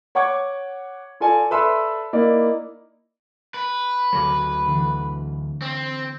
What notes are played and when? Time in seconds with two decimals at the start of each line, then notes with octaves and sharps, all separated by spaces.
0.15 C#5 F#5 C#6 D6 G#6
1.20 F4 A4 D5 G#5
1.51 A4 B4 D5 E5 C6 E6
2.13 A#3 D#4 E4 D5 D#5
3.54 B4
4.13 D2 C#3 F#3 A4 A#5 D6
4.67 D3 E3
5.62 C4